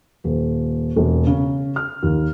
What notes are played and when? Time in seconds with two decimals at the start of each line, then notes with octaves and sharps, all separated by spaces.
0.24 D#1
0.96 E1
1.27 C#3
1.76 F6
2.03 D#2